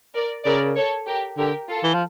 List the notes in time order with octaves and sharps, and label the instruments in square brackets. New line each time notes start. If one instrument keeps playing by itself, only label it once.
[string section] A#4 D5
[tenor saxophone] C#3 [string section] A#4 D5
[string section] A4 C#5
G4 A#4
[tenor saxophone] D3 [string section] G4 A#4
[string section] F4 A4
[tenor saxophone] E3
F3